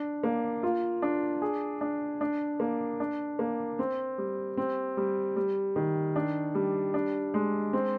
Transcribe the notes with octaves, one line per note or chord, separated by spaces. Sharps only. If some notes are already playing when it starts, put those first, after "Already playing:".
Already playing: D4
A#3
F4
D4
G#4
D4
D4
A#3
D4
A#3
C4
G3
C4
G3
G3
D#3
D4
G3
D4
G#3
C4